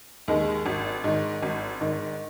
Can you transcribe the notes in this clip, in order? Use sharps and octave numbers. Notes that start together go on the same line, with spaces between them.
D#2 D#3 G#3
G#1
G#2 D#3
G#1
G#2 D#3